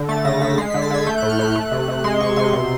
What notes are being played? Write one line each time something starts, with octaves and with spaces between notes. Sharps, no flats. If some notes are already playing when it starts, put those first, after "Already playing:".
Already playing: D3
A3 A6
C#3 A#6
C#3 B6
G#3 C7
D3 B6
A6
D3 G#6
A3 G6
A2 F#6
F6
A2 F#6
A3
C3
C3
G#3 C6
C3 C#6
C3 C6
B2